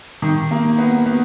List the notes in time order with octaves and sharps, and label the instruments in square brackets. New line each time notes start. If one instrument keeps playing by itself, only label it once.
[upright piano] D#3
A#3
B3
B3